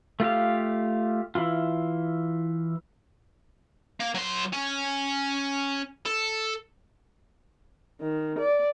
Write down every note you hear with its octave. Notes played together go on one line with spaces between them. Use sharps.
A3 F4 G4 F5
E3 E4 F4
A#3
F#3 C6
C#4
A4
D#3
D5